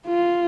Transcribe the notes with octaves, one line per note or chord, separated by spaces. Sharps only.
F4